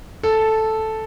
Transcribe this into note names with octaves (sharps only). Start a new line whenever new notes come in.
A4